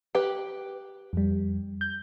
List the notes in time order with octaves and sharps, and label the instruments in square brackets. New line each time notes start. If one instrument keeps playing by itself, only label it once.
[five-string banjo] G4 B4
[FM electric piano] F2 G3
G6